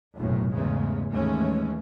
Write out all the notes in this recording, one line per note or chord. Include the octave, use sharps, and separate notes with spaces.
F1 B1 F#2 A2
A1 E2 G#2 C#3 G#3
D#2 E3 G#3 A3 C#4